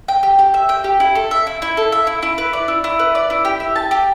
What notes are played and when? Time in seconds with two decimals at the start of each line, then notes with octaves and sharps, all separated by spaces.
0.08 G5
0.23 G4
0.39 G4
0.54 E5
0.69 G5
0.84 G4
1.00 E4
1.15 A4
1.31 E5
1.47 E4
1.62 E4
1.77 A4
1.92 E5
2.07 E4
2.23 E4
2.38 B4
2.53 D5
2.68 E4
2.84 E4
2.99 B4
3.15 D5
3.30 E4
3.45 G4
3.60 E5
3.76 A5
3.91 G4